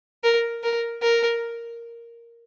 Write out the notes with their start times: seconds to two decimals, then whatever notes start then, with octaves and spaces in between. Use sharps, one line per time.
0.24 A#4
0.63 A#4
1.02 A#4